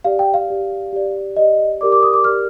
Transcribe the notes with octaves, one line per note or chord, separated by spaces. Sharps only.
G4 D5 F5
G5
F5
G4 D5
G4 D5
G4 D5 D#5
G4 A#4 D5 D6
D6
D#6
D6
G4 A#4 D5 F6